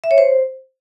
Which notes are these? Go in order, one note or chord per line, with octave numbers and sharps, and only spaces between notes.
E5
C#5
C5